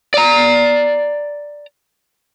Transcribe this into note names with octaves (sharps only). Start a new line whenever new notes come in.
D5 A#5